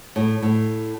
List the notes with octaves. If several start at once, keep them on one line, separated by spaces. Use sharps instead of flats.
A2
A2